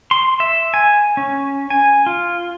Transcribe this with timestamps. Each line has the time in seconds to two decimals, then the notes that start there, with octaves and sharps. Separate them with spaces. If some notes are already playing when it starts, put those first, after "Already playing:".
0.11 C6
0.40 E5
0.74 G#5
1.17 C#4
1.70 G#5
2.06 F4